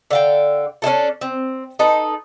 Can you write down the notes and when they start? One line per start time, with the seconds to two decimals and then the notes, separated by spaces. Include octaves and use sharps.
0.11 D3 F5 G5
0.82 C#4 D4 E4 A4
1.21 C4
1.79 D#4 A4 B4